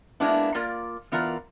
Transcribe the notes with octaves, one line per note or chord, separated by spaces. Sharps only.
G#3 A#3 B3 D4 E4
A#3 F4 A#4 D5
E3 B3 F4 A#4 D5 A#5